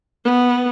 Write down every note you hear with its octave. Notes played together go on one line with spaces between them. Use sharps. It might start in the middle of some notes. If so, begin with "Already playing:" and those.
B3